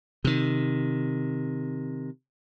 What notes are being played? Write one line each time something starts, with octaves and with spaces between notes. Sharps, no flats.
C3 D#3